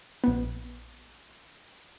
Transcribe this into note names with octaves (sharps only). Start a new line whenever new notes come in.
A#1 B3